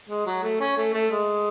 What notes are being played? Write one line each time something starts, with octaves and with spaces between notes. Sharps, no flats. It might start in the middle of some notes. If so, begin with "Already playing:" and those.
G#3
F#3
A3
C#4
A3
A3
G#3